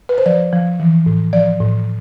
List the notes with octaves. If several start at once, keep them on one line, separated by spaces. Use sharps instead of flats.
B4
C5
F3 D5
F3
E3
A2
F3 D5
A2